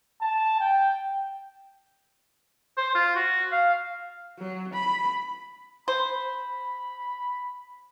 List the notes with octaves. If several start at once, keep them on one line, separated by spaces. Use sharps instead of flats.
A5
G5
C5
F4
F#4
F5
F#3
B5
C5 B5